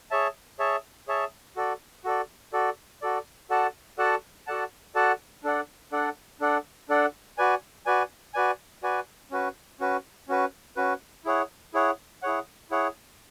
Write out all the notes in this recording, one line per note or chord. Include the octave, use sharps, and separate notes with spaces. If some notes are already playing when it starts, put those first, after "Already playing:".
G#4 C#5 E5 A5
G#4 C#5 E5 A5
G#4 C#5 E5 A5
F#4 A4 D5
F#4 A4 D5
F#4 A4 D5
F#4 A4 D5
F#4 A4 D5 F#5 A5
F#4 A4 D5 F#5 A5
F#4 A4 D5 F#5 A5
F#4 A4 D5 F#5 A5
D4 A4 D5 F#5
D4 A4 D5 F#5
D4 A4 D5 F#5
D4 A4 D5 F#5
F#4 B4 D5 G#5
F#4 B4 D5 G#5
F#4 B4 D5 G#5
F#4 B4 D5 G#5
C#4 F#4 B4
C#4 F#4 B4
C#4 F#4 B4
C#4 F#4 B4
E4 G#4 C#5 F#5
E4 G#4 C#5 F#5
E4 G#4 C#5 F#5
E4 G#4 C#5 F#5